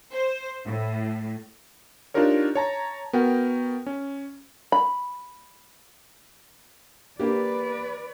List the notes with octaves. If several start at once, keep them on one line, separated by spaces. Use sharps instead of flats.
C5
A2
D4 D#4 F4 G4 A#4 C#5
C#5 A5 A#5
B3 F#4 A#4 F#5 G5
C#4
B5
A#3 G4 B4 D5